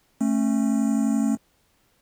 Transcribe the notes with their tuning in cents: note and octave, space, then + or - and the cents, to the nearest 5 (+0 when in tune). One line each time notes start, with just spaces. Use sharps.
A3 +0 C#4 -35